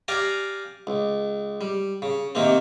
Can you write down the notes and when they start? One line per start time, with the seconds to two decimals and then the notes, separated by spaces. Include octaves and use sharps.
0.08 G4 D5 F5 G#5 A#5
0.87 C#2
1.61 G3
2.02 C#3
2.35 C3 D#3 A#3 C4